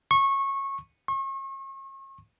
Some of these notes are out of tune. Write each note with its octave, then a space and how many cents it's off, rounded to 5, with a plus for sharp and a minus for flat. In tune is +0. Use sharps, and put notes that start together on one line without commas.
C#6 -20
C#6 -40